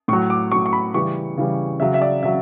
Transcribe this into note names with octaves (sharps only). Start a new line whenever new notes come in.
A2 F#3 C#6
D6
A2 F#3 C#6
C#6
B5
C#3 E3 G3 C#6
C#3 E3 G3
C#3 F#3 E5
E5
D5
C#3 F#3 E5